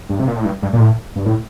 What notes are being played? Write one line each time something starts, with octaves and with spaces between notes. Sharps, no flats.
G2
C3
A#2
A2
G2
G2
A#2
A2
G2
A2